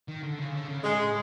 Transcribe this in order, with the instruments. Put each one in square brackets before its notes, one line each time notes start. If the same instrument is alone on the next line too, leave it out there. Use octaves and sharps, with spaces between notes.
[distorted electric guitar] D#3
D3
C#3
D3
C#3
[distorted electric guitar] A2 [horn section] G#3